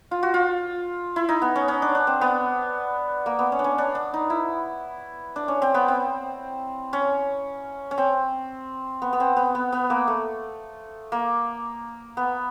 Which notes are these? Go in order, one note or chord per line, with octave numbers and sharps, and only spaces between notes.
F4
F#4
F4
E4
D#4
B3
C#4
C#4
D4
D4
C4
B3
A#3
B3
C#4
D4
C#4
D4
D4
D#4
E4
D4
C#4
C4
B3
C4
C#4
C#4
C4
B3
B3
C4
B3
B3
B3
A#3
A3
A#3
B3